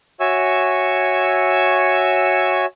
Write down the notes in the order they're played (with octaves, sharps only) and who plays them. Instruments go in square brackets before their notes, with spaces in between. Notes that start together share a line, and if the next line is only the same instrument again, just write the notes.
[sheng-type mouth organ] F#4 C#5 E5 G#5 C#6 E6